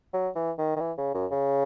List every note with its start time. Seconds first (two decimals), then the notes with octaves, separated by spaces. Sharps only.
0.13 F#3
0.35 E3
0.58 D#3
0.76 D#3
0.80 E3
0.98 C#3
1.14 F#2
1.31 C#3